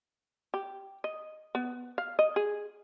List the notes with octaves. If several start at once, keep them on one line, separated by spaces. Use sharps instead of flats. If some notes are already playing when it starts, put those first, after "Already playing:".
G4
D#5
B3
F5
D#5
G#4